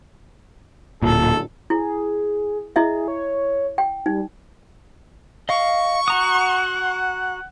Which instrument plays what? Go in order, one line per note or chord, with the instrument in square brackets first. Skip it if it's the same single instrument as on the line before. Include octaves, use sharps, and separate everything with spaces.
[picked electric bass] D1 A#2 [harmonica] A4
[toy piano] E4 [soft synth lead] G#4
[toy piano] E4 D#5 E5 [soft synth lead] G#4
[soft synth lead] C#5
[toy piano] G5
[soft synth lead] G3 [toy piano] D#4
[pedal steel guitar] D#5 F5 [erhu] C#6
[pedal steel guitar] F#4 A#5 D#6 [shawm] F#5